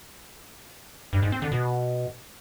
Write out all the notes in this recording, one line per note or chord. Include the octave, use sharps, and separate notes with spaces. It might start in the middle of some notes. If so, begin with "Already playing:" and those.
G2
G#2
C4
D3
B2